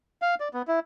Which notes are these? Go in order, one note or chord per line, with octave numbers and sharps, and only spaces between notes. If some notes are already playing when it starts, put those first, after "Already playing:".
F5
D5
B3
E4